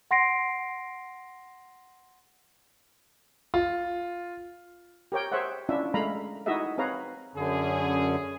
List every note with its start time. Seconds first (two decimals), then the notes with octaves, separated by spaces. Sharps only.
0.11 F#5 C6 A#6 C7 D7
3.54 F4
5.12 G4 A#4 C#5 G5
5.32 G#4 C5 C#5 E5 F#5
5.69 C#4 D4 E4 F4 E5
5.94 G#3 A3 F5 A#5 B5
6.46 D#4 E4 F#4 G#4 D#5 E5
6.78 C4 G#4 B4 C#5 F5 A#5
7.35 F#2 D3 C#4 G#4